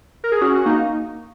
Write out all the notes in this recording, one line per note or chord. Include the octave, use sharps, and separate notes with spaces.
A#4
G#4
C#4 F#4
F#4
A#3 D#4